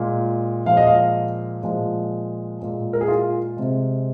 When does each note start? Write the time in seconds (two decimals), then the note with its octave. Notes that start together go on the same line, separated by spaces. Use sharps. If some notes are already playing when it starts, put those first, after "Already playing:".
Already playing: A#2 G#3
0.66 A#2 F3 G#3 F5
0.77 D#5
0.87 F5
1.63 A#2 F3 G#3
2.60 A#2 G#3
2.93 A#4
3.01 G#4
3.08 F4
3.57 C3 G#3